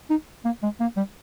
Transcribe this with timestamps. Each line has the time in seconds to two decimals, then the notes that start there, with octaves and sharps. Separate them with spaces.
0.10 D#4
0.45 A#3
0.63 G#3
0.81 A#3
0.97 G3